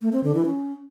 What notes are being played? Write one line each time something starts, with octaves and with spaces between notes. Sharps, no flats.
A3
C4
D3
E3
C#4